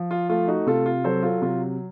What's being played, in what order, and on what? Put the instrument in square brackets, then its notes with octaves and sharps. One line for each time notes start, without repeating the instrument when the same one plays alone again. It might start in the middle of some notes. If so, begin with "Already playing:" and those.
Already playing: [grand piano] F3
F4
A3 F4
D#4 F#4
C3 F4 A4
F4
F#3 A4 C5
F4 A4
C3 F4